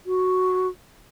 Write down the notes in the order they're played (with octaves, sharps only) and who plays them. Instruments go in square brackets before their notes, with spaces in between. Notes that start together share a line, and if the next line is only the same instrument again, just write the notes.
[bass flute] F#4